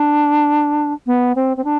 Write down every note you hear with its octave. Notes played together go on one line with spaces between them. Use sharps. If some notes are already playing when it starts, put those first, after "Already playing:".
Already playing: D4
B3
C4
C4
D4